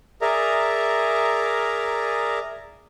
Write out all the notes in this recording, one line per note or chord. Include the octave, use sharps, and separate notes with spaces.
G#4 A#4 D5 E5 A#5